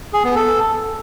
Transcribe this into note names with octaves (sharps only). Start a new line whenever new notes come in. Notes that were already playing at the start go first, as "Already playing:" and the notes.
G#4
B3
A4